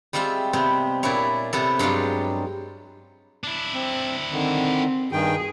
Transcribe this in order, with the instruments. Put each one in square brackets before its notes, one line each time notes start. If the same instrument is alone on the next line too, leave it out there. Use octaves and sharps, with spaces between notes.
[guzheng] G3 G#3 C4 F4 E5
C3 B3 C4
A#2 D4 E4 C#5
C3 B3 A4
G2 F#3 G#3 C4 F4
[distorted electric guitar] D4 E4
[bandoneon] C4
[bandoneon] D3 D#3 [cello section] C4
[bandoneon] G2 D#3 G5 [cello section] G#4